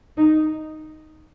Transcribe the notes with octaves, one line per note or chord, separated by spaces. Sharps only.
D#4